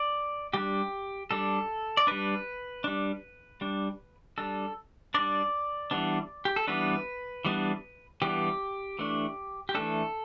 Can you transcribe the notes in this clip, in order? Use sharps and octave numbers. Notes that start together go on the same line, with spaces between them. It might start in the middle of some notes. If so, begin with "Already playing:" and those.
Already playing: D5
G3 D4 G4
G3 D4 A4
D5
G3 D4 B4
G3 D4
G3 D4
G3 D4 A4
G3 D4 D5
E3 G3 B3 D4
G4
A4
E3 G3 B3 D4 B4
E3 G3 B3 D4
E3 G3 B3 D4 G4
E3 A3 D4
G4
E3 A3 D4 A4